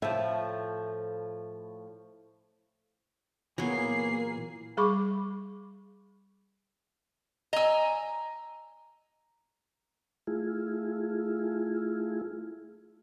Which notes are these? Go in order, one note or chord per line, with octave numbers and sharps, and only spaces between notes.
A2 F3 E5
A#2 E3 F#3 A#3 B3 G#4 C7
G3 G#4 B5 C#6 D6
D#5 G#5 A#5 E6
A3 E4 F4 G#4